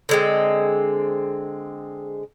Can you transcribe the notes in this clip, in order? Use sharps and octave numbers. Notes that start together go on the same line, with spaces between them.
D3 G#3 C4